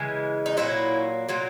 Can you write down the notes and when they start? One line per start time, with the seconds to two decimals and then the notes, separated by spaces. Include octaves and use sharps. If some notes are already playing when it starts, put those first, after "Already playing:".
Already playing: C#3 E3 G#3
0.46 D#4
0.57 A#2 F#3 A#3 C#4 E4
1.28 A#2 F#3 A#3